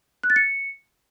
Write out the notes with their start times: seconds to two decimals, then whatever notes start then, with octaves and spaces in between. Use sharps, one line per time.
0.23 F#6
0.30 A6
0.36 C#7